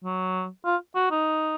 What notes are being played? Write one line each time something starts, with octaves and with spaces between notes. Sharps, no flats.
F#3
F4
F#4
D#4